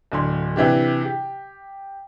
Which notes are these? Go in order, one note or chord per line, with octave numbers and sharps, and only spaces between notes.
D1 D3 C6
C3 E3 D4 G4
G4